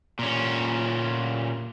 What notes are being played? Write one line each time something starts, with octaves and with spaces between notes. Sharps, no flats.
A#2 C#4